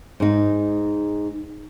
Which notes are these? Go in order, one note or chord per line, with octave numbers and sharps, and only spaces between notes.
G#2 D#4